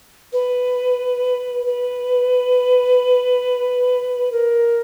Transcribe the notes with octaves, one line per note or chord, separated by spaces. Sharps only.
B4
B4
A#4